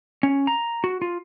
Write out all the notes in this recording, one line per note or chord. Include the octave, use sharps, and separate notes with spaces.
C#4
A#5
F#4
F4